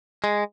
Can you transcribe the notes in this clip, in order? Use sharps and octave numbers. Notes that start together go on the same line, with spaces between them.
G#3